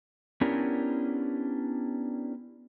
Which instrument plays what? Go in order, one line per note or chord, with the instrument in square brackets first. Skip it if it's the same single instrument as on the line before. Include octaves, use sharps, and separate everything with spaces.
[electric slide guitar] B3 C#4 D4 E4 G4 A#4